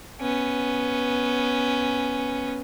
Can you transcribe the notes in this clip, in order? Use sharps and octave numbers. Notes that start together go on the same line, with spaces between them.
B3 C#4